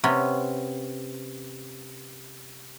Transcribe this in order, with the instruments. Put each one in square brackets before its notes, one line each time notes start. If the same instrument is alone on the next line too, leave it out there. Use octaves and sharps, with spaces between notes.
[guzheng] C3 B3 C#4